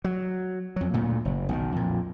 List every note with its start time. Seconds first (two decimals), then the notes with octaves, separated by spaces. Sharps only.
0.04 F#3
0.76 F2 F#3
0.94 D2 A#2 A3
1.25 F#1
1.49 B1 C3 D#3
1.76 F2 A#2